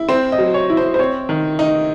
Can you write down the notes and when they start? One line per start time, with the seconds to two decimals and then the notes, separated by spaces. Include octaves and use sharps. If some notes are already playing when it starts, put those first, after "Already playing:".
Already playing: E4
0.09 C4 C5
0.32 D#5
0.38 F#3
0.54 C#5
0.70 E4
0.77 C5
0.94 C5
0.99 C4 C#5
1.29 D#3
1.59 D#4